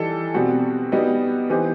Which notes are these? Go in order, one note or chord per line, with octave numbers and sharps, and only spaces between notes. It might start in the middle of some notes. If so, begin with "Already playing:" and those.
Already playing: E3 G3 D#4 A4
B2 G3 C4 F#4
G3 B3 D#4 F#4
E3 B3 D#4 G4 C5